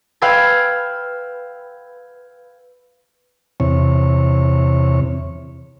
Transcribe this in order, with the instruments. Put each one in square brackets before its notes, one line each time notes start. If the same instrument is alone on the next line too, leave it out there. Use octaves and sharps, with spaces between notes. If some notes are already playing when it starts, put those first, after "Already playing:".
[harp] B4 F5 G5 E6 G#6
[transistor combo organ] E2 C3 C#5